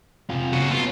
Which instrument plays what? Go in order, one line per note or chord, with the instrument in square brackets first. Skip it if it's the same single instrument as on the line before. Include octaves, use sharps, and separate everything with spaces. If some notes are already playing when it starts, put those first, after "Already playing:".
[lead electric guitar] C3 F4
[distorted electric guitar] C#3 F#4
[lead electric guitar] F#3 B3 [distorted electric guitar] F4